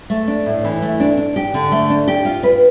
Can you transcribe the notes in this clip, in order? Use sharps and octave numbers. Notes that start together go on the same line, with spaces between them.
A3
D4
A2
E3
A3
D4
D4
G4
D3
A3
D4
G4
F4
B4